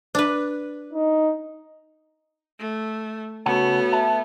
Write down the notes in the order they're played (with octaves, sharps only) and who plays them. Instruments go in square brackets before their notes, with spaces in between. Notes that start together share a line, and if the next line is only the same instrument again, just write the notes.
[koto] D4 B4
[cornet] D#4
[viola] A3
[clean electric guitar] C#3 F#5 A5 [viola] A3 B3 [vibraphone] F#4 C#5
[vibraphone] E5 [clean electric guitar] A5